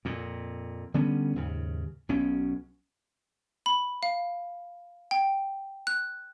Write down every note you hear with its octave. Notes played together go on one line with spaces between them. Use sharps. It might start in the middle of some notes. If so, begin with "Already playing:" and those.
F2 A#2
D3 G3 B3 C#4
D#2 G#2 C#3
B1 B2 C#4
B5
F5
G5
F#6